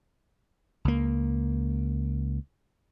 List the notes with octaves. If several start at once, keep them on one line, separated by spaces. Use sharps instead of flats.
C#2 A#3